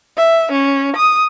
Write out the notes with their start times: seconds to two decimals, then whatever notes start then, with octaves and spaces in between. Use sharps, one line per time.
0.18 E5
0.52 C#4
0.96 D#6